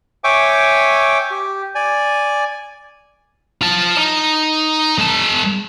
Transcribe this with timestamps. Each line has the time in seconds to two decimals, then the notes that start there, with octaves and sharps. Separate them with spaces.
0.24 C#5 E5 G5 G#5 C#6 D6
1.31 G4
1.75 D5 G#5
3.61 F4 A5
3.97 D#4
4.98 G#3 A5